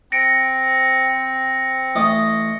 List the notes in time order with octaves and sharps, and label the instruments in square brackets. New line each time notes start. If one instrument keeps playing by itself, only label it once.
[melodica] C4 [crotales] A#6 C#7 D7
[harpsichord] A1 D5 D#5